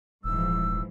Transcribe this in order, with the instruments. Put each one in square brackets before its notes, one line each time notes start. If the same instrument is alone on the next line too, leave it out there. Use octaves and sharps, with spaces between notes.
[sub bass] D#1 [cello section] G#2 E3 F3 [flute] E6